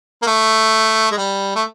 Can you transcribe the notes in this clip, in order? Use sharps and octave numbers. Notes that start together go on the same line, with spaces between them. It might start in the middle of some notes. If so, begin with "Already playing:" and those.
A#3
A3
G#3
G3
A3